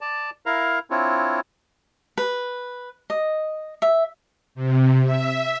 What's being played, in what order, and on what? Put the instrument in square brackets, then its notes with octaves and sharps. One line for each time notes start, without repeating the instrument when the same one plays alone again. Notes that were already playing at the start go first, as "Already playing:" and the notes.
[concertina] D5 A5
E4 A#4 F5 A#5
C4 D4 E4 F4 C#5
[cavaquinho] B4
D#5
E5
[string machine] C3
E5